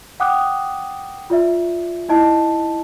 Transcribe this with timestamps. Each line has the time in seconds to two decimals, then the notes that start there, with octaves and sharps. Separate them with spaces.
0.20 F#5 G5 D6 D#6 F#6
1.30 F4 D5 E5
2.09 D#4 E4 D#5 A5